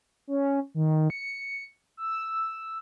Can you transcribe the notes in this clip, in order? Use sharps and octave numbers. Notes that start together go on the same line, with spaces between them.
C#4
D#3
C#7
E6